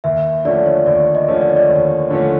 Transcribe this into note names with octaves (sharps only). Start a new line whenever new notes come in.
D#2 E5
D3 F3 A3 C#4 D5
C#5
D#2 D5
D#5
D3 F3 A3 C#4
D5
D#5
D5
D#2 C#5
D3 F3 A3 C#4